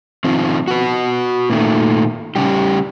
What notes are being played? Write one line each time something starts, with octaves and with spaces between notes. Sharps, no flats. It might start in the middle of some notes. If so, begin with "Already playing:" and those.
D#3 F3 C4
F#4 B4
A#2 D#3 A3
C#3 G3 G4